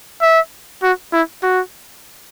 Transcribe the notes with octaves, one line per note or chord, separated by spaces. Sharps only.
E5
F#4
E4
F#4